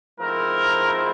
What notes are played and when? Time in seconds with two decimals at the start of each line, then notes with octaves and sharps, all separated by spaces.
0.20 G#2 F3 A3 C4 E4 A#4